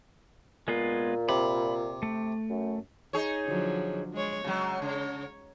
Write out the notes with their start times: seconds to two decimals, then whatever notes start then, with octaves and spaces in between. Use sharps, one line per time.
0.68 A#2 G#3 B3 F4
1.29 C3 B5
2.03 A3
2.49 F#2
3.13 D#4 G#4 C#5
3.45 D3 F3 F#3
4.13 G#3 C#5
4.44 C#3 F#3 G#3
4.82 C#3 C#5